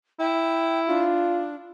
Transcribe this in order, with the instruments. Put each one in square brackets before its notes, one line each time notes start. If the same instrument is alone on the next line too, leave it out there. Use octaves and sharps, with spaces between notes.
[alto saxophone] E4 [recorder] G5
[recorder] D4 [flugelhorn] F4